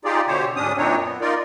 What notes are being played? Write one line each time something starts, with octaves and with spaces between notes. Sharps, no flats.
D#4 F4 G4 G#4 D5
B2 D3 G4 C5 C#5
D2 G#2 C#4 D4 D#6
F#2 A#2 C4 D4 D#4 C#5
B3
D#4 F4 A#4 D5